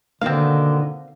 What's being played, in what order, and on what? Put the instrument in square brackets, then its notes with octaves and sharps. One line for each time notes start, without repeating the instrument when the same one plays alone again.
[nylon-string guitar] B2 D#3 A#3 [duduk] D3 [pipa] C4 F5